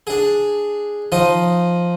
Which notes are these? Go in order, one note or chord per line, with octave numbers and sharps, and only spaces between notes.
D4 G#4
F3 D#4 D#6